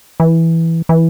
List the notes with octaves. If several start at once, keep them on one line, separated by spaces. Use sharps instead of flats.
E3
E3